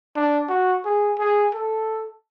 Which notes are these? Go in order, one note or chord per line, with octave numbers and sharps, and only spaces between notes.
D4
F#4
G#4
G#4
A4